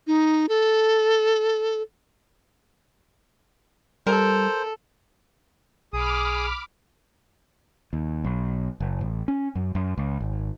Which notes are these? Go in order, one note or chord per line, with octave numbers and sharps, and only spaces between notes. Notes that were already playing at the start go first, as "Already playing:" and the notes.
D#4
A4
G3 A4 A#4 C5
B1 G#4 B5 D6 D#6 F6
D#2
B1
F#1
A1
C#4
F#2
F#2
C#2
G#1